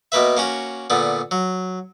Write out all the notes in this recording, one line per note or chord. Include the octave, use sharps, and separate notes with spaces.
B2 A#3 B4 E5
A#3 C#4 F#4
A#2 D3 B3
F#3